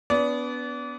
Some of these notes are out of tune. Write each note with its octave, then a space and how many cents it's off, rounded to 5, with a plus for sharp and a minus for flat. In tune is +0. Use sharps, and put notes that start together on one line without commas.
B3 +0 D4 -40 D5 -30